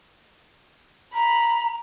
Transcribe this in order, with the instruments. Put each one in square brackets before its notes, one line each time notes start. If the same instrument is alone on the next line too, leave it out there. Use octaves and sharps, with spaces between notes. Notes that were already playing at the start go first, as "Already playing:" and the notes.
[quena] A#5 [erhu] B5